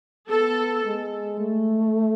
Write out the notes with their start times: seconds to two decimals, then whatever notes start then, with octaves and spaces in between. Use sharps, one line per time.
0.29 B3 A4
0.85 G#3
1.39 A3